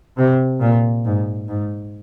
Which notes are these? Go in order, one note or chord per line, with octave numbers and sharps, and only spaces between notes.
C3
A#2
G#2
G#2